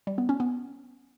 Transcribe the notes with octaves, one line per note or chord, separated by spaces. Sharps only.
G3
B3
C#4
B3